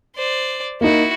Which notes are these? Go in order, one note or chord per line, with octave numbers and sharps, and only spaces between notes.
C5 D5
A#3 D#4 E4 F#4